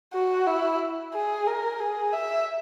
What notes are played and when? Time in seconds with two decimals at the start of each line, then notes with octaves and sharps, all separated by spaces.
0.14 F#4
0.47 E4
1.14 G#4
1.47 A#4
1.81 G#4
2.13 E5